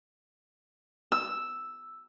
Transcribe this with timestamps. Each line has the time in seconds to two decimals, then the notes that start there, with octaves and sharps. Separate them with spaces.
1.12 E6